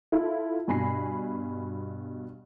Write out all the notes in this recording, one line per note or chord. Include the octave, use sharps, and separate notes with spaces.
E4 F4 A4
G2 B2 G#5 B5 A#6 C7